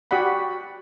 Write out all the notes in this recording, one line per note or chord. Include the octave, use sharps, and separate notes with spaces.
F#4 G4 D5 F#5 B5